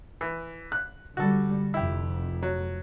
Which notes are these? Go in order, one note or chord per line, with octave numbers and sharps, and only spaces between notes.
E3
F#6
D3 G3 F#4 A4
F1 F2 E4 G4
F#3